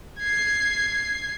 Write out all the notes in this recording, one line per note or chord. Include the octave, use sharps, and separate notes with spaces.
G#6 C7